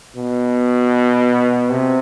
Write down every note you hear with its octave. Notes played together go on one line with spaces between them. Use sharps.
B2
C3